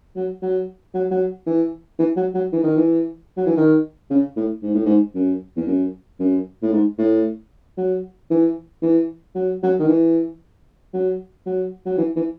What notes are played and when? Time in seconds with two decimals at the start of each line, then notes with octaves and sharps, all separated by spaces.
0.16 F#3
0.42 F#3
0.94 F#3
1.11 F#3
1.46 E3
1.99 E3
2.16 F#3
2.34 F#3
2.53 E3
2.63 D#3
2.76 E3
3.37 F#3
3.46 E3
3.57 D#3
4.10 C#3
4.36 A2
4.62 G#2
4.75 A2
4.85 G#2
5.15 F#2
5.56 E2
5.67 F#2
6.19 F#2
6.62 A2
6.72 G#2
6.98 A2
7.77 F#3
8.30 E3
8.82 E3
9.35 F#3
9.63 F#3
9.79 D#3
9.88 E3
10.94 F#3
11.46 F#3
11.86 F#3
11.98 E3
12.16 E3